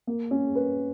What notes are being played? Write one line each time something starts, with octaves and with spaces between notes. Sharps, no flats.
A#3
C#4
B4